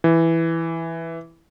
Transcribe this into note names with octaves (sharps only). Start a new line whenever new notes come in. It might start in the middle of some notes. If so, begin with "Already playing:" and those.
E3